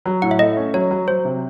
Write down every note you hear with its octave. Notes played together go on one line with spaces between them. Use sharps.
F#3
A2 F#5
E5
A3 D#5
C#4
F#3 C#5
F#3
F#3 C5
C3